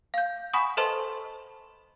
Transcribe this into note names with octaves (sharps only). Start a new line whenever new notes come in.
F5 G6
F#5 G#5 B5 C#6 D#6
A4 B4 C5 D#5 A5 C6